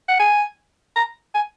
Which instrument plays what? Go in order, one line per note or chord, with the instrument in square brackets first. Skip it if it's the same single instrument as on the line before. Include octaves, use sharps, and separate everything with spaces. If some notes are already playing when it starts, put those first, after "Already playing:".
[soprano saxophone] F#5
G#5
A#5
G#5